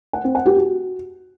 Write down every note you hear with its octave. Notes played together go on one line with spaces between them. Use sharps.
F#5
C4
F#5
G4
F#4